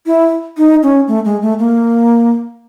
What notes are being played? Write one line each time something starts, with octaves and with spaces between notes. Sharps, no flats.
E4
D#4
C#4
A3
G#3
A3
A#3